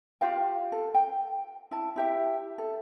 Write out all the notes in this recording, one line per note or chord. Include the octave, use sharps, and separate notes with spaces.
F4 G4 F5 G5
A4
G5
E4 A5
E4 G4 E5
A4